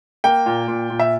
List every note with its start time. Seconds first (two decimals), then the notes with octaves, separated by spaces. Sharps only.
0.24 A#3 G5
0.46 A#2
0.68 A#2
0.90 A#2
0.99 E5